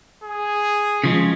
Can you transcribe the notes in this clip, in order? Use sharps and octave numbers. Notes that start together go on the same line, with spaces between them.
G#4
C#3 F3 G#3